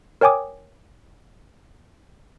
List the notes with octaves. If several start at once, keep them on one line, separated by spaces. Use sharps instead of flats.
A#4 C#5 G5 G#5 D6 D#6